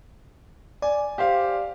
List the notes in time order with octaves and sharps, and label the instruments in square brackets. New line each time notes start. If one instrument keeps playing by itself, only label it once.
[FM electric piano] D5 [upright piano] G#5
[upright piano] G4 C5 F5